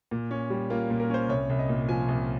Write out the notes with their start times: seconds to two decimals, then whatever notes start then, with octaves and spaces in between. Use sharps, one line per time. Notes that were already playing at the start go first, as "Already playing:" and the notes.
0.11 A#2
0.31 C#4
0.50 G3
0.70 A#3 F4
0.90 A#2
1.00 A#4
1.10 C#4 C5
1.29 C2 C#5
1.50 C2
1.59 D#5
1.69 A#2
1.89 F3 G#5
2.09 C2